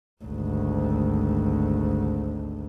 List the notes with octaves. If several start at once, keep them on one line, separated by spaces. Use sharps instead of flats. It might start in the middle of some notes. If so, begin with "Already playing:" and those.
G#1 D2